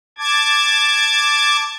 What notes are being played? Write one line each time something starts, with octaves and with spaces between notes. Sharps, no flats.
A5 D6 G#6